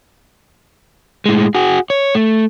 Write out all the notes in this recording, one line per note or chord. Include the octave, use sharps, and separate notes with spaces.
A2 G#3
F#4 G#4
C#5
A3